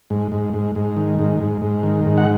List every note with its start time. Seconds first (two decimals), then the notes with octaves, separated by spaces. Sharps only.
0.10 G#2
0.32 G#2
0.53 G#2
0.75 G#2
0.97 D#3
1.19 G#2
1.40 G#2
1.62 G#2
1.83 D#3
2.05 G#2
2.18 F#5